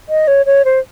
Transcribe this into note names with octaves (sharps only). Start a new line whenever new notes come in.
D#5
C#5
C#5
C5